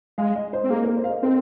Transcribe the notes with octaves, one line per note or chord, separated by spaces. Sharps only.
G#3 F5
D#5
C5
C4
A#3 G#4
A#4
C5
F5
D#5
C4 A#4